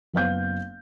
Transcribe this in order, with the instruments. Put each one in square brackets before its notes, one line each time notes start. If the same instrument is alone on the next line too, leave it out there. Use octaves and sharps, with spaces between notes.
[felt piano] F#1 B3 F5 G6